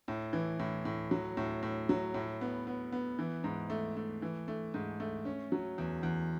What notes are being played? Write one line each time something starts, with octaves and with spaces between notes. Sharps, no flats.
A2
E3
A2
A2
F#3
A2
A2
F#3
A2
B3
B3
B3
E3
G#2
A3
A3
E3
A3
G#2
A3
C#4
F#3
E2
E2